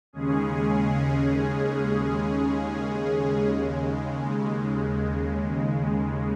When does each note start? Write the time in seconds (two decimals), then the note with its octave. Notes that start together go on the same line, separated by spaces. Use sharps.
0.13 D#2 C#3 G#3 C#4 G#4
3.46 D#2 C#3 G#3